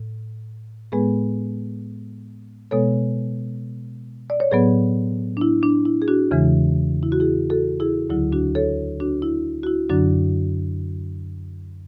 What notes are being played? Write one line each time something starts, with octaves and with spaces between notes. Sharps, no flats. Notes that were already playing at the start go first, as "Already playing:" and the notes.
Already playing: A2
A2 G#3 B3 G#4 B4
B2 G#3 B3 A4 C#5
D5
C#5
A2 F#3 B3 G#4 B4
D4
E4
D4
E4
G#4
D4 F#4
E2 C#3 E3 G#3
E4
F#4
E4 G#4
F#4 A4
E4 G#4
D2 D3 F#3 E4
D4 F#4
A4 C#5
D4 F#4
E4
F#4
E4
F#2 D3 F#3 D4 F#4